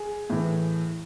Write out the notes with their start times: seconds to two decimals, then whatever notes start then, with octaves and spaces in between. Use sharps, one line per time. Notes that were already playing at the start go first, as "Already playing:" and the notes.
Already playing: G#4
0.30 A2 E3